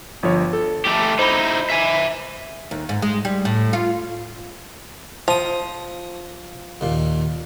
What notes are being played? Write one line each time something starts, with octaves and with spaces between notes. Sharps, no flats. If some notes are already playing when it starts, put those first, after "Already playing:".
G1 F3 C#5
A4
A3 G4
D#4 E4 C5 B5
E5 G#5
D#2
G#2
G#3
G3
A2
F4
F3 A#5 D#6
D#2 A#2